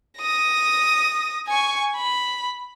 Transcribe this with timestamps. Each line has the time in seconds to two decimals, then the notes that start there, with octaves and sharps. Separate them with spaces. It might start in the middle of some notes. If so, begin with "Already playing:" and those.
0.19 D#6 A#6
1.48 G#5 C#6
1.96 B5